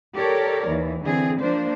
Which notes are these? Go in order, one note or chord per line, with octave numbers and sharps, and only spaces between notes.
G4 A4 A#4 C#5 D5
D#2 E3
D3 E3 C4 G#4
F3 A#3 D4 C5